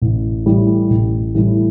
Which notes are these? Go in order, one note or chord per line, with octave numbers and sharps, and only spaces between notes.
A1
A2 E3 G3
A1
A2 E3 G3